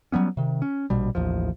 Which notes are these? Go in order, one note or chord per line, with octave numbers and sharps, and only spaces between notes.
F#3 G3 B3 C#4
C3 D#3
C#4
A#1 B2 G3
A1 D#2 F3